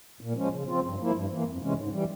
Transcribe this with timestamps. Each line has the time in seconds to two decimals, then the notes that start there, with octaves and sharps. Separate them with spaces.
0.21 A#2
0.36 F3 G#3 C#4
0.51 C#3
0.67 F3 C4 F4
0.83 G2
0.99 F3 A#3 E4
1.14 G2
1.30 E3 A#3
1.45 F2
1.61 C3 E3 G#3 C#4
1.76 G#2
1.92 E3 G3